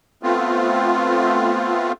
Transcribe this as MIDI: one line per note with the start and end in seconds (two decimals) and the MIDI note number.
0.23 1.92 57
0.23 1.92 59
0.23 1.92 60
0.23 1.92 65